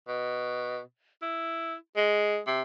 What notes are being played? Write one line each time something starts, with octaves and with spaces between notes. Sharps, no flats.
B2
E4
G#3
C3